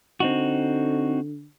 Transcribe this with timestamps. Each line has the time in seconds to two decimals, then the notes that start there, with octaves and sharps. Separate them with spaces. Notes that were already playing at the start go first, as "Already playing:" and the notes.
0.20 D3 C4 D#4 F#4